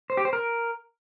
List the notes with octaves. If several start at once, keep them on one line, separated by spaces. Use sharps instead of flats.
C5
G4
C5
A#4